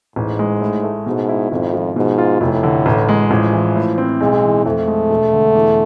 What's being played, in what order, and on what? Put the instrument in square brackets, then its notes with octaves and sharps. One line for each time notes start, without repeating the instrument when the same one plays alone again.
[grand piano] A1 [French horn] G#2
[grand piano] G#3
A2
A3
[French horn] G#2 [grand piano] B2
[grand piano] E4
[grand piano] G#1 [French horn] F2
[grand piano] F3
[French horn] G#2 [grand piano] B2
[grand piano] F4
[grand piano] F1 [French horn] A2
[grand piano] D3
A1
G#3
[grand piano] A1 [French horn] F3
[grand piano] E3
A2
C4
[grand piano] B1 [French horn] G#3
[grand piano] E3
[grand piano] F2 [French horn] A3
[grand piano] G#3
E1
D3
E2